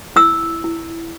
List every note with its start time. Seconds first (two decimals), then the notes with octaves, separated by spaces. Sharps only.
0.16 E4 E6
0.64 E4